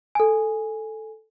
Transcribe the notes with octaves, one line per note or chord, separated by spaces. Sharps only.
A4 G#5